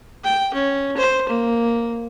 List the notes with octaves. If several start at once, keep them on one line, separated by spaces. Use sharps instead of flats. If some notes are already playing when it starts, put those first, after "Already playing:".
G5
C#4
C5
A#3